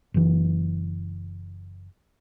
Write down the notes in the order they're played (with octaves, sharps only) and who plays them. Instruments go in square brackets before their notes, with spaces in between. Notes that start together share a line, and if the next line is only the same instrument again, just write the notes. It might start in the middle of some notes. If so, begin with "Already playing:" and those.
[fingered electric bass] F#1 E3